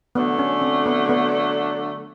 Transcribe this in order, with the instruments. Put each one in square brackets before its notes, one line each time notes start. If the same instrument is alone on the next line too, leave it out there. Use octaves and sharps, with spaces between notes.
[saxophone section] D3 F#3 A3 D4 [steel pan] B3
[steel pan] C#4
C4
B3
B3